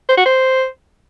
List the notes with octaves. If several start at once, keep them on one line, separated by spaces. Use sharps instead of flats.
C5
F#4
C5